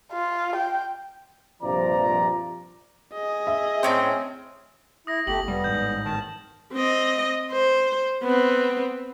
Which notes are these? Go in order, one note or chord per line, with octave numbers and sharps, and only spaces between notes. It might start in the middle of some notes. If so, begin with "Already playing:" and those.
F4
G5
A#1 G2 C3 F3 D5 A#5
G#4 D#5
E5
A2 C4 C#4 G5
E4 D#6 A#6
G1 A3 G4 F#7
F1 G3 B3
A1 G#2 G6
D#3 A5
C4 D#5
C5
B3 C4